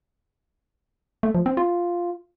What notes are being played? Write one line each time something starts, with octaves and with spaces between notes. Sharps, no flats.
A3
F3
C4
F4